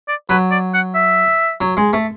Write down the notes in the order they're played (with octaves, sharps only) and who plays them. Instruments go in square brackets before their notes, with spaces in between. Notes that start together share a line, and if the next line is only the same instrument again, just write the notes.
[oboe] D5
[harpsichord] F#3 [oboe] B4
[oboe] D5
F#5
E5
[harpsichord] F#3
G#3
A3